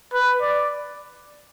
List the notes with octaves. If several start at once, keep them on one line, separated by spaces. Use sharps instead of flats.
B4
D5